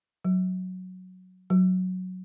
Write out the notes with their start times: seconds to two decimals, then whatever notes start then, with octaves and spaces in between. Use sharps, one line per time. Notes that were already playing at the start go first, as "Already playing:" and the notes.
0.25 F#3
1.50 F#3